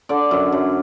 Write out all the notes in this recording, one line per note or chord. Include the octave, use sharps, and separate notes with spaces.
D3 D5
F#2
F#2